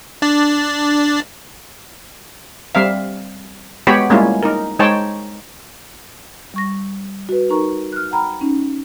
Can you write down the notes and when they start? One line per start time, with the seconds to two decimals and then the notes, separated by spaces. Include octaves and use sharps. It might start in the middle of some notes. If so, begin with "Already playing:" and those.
0.22 D4 D5
2.75 G3 C4 E5 F5
3.87 G#3 B3 F#4 G4 C#5 B5
4.10 G3 G#3 A#3 C#4 E4 F4
4.43 D#4 A#4
4.79 G#3 D#4 C5 C#5 G5 A5
6.54 G3 C#6 A#6
7.29 F#4 B4
7.50 D#4 A#4 A#5 C#6
7.93 F6 F#6
8.11 F#5 G5 A#5 B5 F6
8.41 C#4 D#4